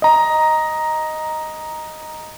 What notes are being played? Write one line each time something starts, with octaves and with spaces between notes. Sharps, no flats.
D#5 A#5